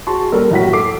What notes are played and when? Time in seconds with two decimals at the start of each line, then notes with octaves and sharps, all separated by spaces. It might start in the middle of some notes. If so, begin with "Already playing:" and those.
0.07 F#4 G#4 A5 C6 C#6
0.32 G3 A4 A#4
0.51 F#2 A2 F#4 F#5 B6
0.73 A4 D6 C7